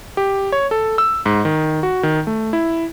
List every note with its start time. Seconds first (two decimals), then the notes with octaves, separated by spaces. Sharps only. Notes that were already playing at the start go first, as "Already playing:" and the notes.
0.17 G4
0.52 C#5
0.71 A4
0.98 E6
1.26 G#2
1.45 D#3
1.83 F#4
2.03 D#3
2.27 A3
2.53 E4